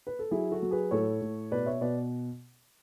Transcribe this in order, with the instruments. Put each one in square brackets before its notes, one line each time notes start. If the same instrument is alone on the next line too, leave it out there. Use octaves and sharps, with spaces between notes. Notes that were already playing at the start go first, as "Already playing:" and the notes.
[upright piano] B4
A4
F#3 E4 G#4
F#4 A4
F#3
G#4 B4
A2 A4 C#5
A2
B2 B4 D5
C#5 E5
B2 B4 D5